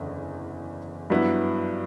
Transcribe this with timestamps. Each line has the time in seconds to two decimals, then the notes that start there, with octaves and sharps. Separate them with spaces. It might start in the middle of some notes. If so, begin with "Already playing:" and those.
Already playing: F#1 E2 D3
1.10 G2 F#3 B3 E4